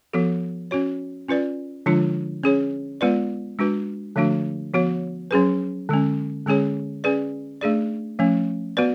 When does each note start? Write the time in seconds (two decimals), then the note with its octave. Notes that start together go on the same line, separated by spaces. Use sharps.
0.13 F3 B3 F#4 A4
0.71 C#4 F#4 C#5
1.28 C#4 F4 B4 D5
1.86 D3 F3 G#3 D4 F4
2.43 C#4 G#4 C#5
3.01 G#3 B3 F4 B4 D5
3.59 G#3 D4 F#4 B4
4.16 D3 F3 A3 D4 F#4
4.74 F3 B3 F#4 C#5
5.31 F#3 C#4 G#4 B4
5.89 D3 G#3 C#4
6.46 D3 G#3 C#4 G#4 C#5
7.04 C#4 G#4 B4 D5
7.61 A3 D4 G#4 D5
8.19 F3 A3 C#4
8.77 B3 F#4 B4 D5